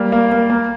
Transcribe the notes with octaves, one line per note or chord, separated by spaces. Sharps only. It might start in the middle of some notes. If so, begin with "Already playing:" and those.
Already playing: G3 A#3
A#3
A#3
A#3